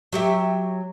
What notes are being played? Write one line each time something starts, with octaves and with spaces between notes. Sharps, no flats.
F#3 G4 E5